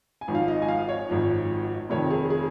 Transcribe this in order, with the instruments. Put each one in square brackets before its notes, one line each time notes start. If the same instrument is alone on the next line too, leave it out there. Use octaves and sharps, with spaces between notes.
[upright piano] G#5
G#1 G#2 F3
F5
D#5
G#5
F5
C#5
G#1 G#2 F3
F1 F2 D#3 C#5
G#4
G#4